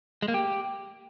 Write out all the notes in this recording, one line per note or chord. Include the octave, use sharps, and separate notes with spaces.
G#3
A#3
G4